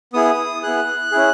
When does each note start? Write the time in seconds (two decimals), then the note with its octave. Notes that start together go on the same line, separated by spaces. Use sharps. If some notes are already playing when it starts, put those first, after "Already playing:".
0.13 B3 E4 G#4 D#6
0.63 B3 E4 G#4 F#6
1.12 C#4 E4 G#4